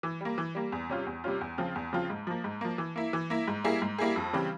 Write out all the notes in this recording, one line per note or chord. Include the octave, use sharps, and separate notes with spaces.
E3
G3 A#3
E3
G3 A#3
E2
C3 G3 C#4 F4
E2
C3 G3 C#4 F4
E2
C#3 F3 C4 F4
E2
C#3 F3 C4 F4
G#2
F3 A#3
G#2
F3 A#3
E3
A#3 E4
E3
A#3 E4
G#2
G3 A#3 E4 G#4
G#2
G3 A#3 E4 G#4
F2
C#3 E3 G3 C4